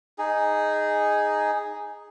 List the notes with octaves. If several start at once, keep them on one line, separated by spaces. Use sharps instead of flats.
D#4 G#4